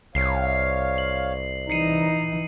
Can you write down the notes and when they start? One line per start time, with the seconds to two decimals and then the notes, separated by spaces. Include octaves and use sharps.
0.15 C2 C#5 F5 C7
0.98 F#7
1.70 E3 D#4 A#5 C7 C#7 D#7